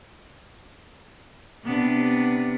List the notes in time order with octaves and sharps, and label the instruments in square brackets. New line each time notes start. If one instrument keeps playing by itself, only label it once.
[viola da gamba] C3 B3 D4